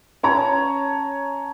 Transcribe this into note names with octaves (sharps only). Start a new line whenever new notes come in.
C#4 C#5 A5 A#5